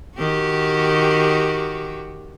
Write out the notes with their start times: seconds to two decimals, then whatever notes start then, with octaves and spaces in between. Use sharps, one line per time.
0.18 D#3 F#4 G4